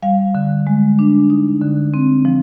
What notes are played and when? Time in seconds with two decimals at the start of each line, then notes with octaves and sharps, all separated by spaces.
0.02 G3 F5
0.35 D3
0.67 G#3
0.99 D4
1.30 D#4
1.61 D3
1.94 C4
2.25 F3